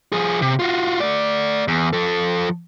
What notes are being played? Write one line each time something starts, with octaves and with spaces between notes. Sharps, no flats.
F3 G#4
C3
F4 F#4
A3 D5
E2
F3 A4